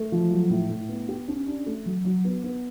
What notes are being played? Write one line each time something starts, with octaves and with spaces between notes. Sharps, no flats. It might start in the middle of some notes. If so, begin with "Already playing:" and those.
Already playing: A3
F3
F#3
A2
A2
B3
G4
C#4
D4
A3
F#3
F#3
B3
B3